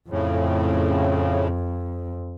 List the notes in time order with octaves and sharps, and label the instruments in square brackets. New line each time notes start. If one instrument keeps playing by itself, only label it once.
[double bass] F2 [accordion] A2 C#3